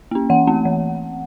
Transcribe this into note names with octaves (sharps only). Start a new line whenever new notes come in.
A#3 C#4
E3 F#5
A3 C4
E3